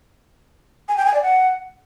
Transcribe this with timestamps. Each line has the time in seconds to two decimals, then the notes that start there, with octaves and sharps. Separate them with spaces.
0.89 G#5
0.97 G5
1.05 G#5
1.14 D5
1.22 F#5